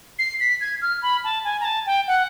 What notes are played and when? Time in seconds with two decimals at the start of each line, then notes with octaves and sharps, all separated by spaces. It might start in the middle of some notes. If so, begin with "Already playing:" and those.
0.19 C7
0.40 B6
0.61 G#6
0.82 F6
1.02 B5
1.24 A5
1.44 G#5
1.61 A#5
1.65 A5
1.86 G5
2.07 F#5